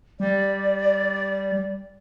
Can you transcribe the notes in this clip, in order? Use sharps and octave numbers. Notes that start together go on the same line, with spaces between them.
G3 D5